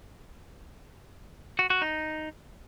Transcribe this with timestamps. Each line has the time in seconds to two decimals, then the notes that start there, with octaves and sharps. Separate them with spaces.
1.59 F#4
1.70 F#4
1.82 D#4